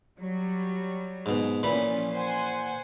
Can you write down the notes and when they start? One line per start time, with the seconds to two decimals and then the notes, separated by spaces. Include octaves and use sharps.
0.19 F#3 G3
1.26 G#2 B2
1.63 A#2 E3 F3 C#4 B5
2.13 C5 F#5 G#5